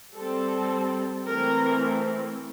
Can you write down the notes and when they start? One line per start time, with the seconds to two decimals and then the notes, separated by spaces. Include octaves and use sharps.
0.14 G3 C4 A4
1.27 E3 A3 C4 A#4